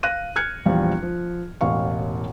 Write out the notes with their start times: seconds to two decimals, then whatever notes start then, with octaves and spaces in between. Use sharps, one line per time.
0.03 F5 F#6 A#6 D#7
0.36 F6 F#6 G#6 C#7
0.65 A#1 E2 F3 G3 F5
1.02 F3
1.61 E1 A1 F5 C#6